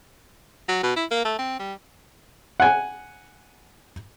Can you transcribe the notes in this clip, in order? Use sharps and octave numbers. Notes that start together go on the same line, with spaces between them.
F#3
B2
E4
A#3
A3
C4
G3
F#5 G#5